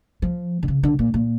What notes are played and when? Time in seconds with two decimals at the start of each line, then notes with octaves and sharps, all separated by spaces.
0.22 F3
0.63 D3
0.68 C#3
0.83 D3
0.99 A#2
1.14 A#2